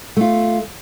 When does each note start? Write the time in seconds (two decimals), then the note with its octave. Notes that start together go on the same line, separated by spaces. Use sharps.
0.17 A3 F4